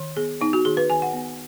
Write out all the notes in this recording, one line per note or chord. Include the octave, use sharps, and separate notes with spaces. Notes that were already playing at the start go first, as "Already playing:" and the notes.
Already playing: D#3
B3 G#4
B3 D#4
F#4
D#3 G#4
B4
D#3 G#5
F#5
B3